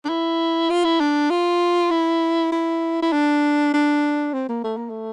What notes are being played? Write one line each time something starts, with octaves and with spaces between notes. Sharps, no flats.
D4
E4
F4
E4
D4
F4
E4
E4
E4
D4
D4
C4
A#3
A3
A#3
A3